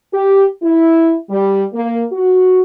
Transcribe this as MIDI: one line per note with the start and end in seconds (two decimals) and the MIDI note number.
0.13 0.45 67
0.63 1.15 64
1.30 1.64 55
1.74 2.04 58
2.12 2.63 66